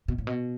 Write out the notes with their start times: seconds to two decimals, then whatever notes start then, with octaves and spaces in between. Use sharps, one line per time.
0.08 B2
0.18 A2
0.27 B2